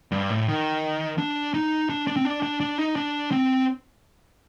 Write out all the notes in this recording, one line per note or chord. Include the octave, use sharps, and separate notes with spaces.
G2
A2
D#3
D4
D#4
D4
D4
C4
D4
D4
D4
D#4
D4
C4